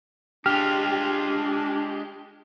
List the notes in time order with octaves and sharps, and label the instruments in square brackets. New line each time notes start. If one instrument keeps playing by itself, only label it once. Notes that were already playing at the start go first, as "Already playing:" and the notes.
[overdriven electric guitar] G#3 F4 [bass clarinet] D4 [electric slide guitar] G4 [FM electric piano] F6